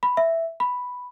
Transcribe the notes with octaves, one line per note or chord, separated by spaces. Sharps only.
B5
E5
B5